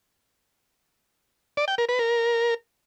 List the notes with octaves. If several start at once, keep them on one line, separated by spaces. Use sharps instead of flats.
D5
G5
A#4
B4
A#4